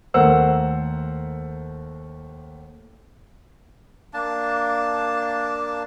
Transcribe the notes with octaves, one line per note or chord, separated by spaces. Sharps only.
D#2 A3 A#4 C5 F#5 E6
A#3 D4 A5